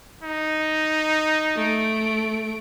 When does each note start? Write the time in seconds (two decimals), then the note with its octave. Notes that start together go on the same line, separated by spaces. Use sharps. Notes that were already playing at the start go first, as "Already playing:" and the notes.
0.23 D#4
1.56 A3 D7